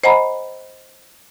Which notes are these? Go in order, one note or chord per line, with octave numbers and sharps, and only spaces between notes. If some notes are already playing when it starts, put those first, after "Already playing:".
C5 D#5 F#5 G#5 A#5 B5